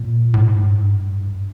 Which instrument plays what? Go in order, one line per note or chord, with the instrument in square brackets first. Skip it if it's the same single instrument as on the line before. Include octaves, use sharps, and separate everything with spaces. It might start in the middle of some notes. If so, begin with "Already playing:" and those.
Already playing: [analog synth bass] A#2
A2
G#2
G2
G#2
G2